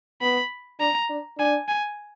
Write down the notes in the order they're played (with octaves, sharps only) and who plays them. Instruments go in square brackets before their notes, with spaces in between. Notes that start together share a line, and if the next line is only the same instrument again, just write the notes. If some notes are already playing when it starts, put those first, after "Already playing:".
[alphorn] B3 [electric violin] B5
[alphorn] D4 [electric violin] A#5
[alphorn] D4
[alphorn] D4 [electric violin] G#5
[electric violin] G#5